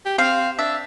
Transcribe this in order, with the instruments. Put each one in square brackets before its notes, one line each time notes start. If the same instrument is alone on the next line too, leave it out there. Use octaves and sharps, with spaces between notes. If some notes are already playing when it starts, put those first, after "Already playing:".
[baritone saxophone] G4
[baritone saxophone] C4 [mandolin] F5
[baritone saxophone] D4 [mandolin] E5